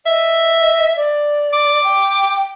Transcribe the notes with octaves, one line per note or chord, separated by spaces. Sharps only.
D#5 E5
D5
D6
G5